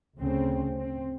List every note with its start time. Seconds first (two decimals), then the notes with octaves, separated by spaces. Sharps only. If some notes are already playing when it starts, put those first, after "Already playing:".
0.18 D2 C#3 C4
0.78 C4